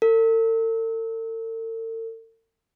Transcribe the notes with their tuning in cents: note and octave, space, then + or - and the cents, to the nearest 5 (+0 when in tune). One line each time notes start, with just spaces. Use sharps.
A4 +45